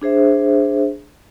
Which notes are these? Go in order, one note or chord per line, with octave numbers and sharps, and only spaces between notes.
D4 G#4 C5 E5